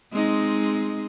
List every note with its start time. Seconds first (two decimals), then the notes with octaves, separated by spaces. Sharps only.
0.12 G#3 C4 D#4